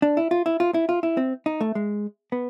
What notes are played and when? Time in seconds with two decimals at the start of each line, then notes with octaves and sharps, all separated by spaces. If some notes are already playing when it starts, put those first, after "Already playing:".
0.02 D4
0.17 E4
0.31 F4
0.46 E4
0.60 F4
0.74 E4
0.89 F4
1.03 E4
1.17 C4
1.46 D#4
1.61 A3
1.75 G#3
2.32 B3